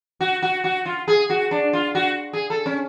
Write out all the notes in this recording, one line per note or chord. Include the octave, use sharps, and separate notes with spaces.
F#4
F#4
F#4
F4
G#4
F#4
D4
F4
F#4
G#4
A4
C#4